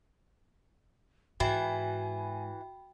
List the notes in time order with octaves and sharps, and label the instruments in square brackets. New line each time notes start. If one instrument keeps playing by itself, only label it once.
[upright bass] G#2 [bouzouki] E3 [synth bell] F#4 G5 B5 [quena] G#5